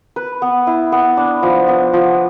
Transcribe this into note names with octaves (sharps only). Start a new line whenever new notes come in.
B4
B3
E4
B3
D4
F3
B3
F3